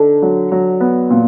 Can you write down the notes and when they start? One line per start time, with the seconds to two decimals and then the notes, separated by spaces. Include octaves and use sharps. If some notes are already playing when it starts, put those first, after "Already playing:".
Already playing: D3 D#4
0.22 F#3
0.52 F#3
0.81 B3
1.10 A#2